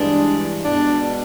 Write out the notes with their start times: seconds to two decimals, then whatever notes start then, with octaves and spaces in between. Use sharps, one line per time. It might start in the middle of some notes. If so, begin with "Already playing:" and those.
Already playing: G2 E3 G#3 D4
0.64 B2 G#3 D4